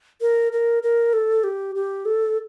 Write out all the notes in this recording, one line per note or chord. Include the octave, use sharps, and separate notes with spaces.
A#4
A#4
A#4
A4
G4
G4
A4